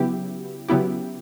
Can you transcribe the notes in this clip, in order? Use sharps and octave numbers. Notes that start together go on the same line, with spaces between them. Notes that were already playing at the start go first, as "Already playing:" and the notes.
Already playing: C#3 F#3 B3 E4 G4
C#3 F#3 B3 E4 G4